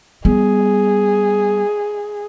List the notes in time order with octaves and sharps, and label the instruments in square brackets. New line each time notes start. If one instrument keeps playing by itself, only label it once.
[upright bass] G3 B3 [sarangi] G#4